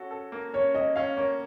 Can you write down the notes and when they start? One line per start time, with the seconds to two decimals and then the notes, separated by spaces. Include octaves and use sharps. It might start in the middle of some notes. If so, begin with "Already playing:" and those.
Already playing: C#4 F#4 A4
0.11 A4
0.32 A#3
0.54 C#4 C#5
0.75 C#4 D#5
0.96 C#4 F5
1.17 A#3 C#5